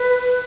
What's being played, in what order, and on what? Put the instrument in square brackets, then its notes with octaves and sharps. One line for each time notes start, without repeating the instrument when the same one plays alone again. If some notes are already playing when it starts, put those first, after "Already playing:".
Already playing: [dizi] B4